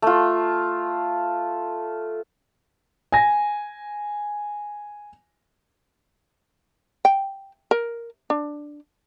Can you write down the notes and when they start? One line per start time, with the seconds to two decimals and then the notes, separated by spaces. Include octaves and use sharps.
0.02 A3 F4
3.12 G#5 A#6
7.05 G5
7.71 A#4
8.30 D4